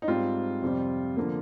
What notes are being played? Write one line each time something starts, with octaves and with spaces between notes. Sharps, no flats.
D#4
G#2 G3 C4 F4
F2 C3 G3 C4
D3 F3 A#3